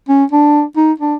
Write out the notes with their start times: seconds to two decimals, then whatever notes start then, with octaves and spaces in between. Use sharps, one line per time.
0.09 C#4
0.32 D4
0.77 D#4
1.00 D4